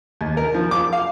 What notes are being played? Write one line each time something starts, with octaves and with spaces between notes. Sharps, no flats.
D#2
A#4
F3
D6
F5